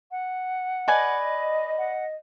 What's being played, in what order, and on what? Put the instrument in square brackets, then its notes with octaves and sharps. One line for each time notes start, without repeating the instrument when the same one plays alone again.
[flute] F#5
[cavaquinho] B4 D5 G#5 [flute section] D#5
[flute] F#5